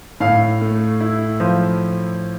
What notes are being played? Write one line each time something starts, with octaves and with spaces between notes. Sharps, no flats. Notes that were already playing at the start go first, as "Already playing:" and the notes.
A2 F5
A3
E4
F3